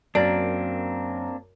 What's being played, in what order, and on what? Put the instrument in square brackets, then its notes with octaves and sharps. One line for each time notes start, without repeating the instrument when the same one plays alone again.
[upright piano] F#2 [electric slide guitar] A#3 C4 D4 [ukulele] D5